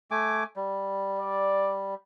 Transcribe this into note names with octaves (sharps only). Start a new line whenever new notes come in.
A3 G#5 D6
G3
D5